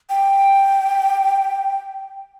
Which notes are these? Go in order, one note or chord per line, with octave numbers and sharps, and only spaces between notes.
G5